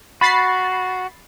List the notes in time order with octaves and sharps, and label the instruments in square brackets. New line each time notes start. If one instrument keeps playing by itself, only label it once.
[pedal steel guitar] F#4 [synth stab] B5 A6 C7